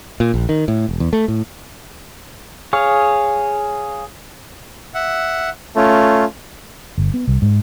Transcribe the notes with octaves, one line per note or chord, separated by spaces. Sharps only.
A#2
A#1
D#3
A2
E1
E2
A3
A2
G#4 C#5 F5
E5 F#5
A3 C#4 F4
G1
B3
C2
G#2